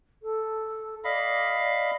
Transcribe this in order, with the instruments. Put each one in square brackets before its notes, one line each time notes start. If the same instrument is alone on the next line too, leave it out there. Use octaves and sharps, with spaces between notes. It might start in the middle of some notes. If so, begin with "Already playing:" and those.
[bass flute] A4
[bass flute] D5 [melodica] D#5 F5 B5